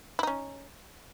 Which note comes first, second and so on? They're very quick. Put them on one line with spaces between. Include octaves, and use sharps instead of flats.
E4 D#4 C#4